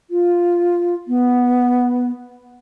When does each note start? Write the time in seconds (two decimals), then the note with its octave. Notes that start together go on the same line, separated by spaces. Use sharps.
0.11 F4
1.08 B3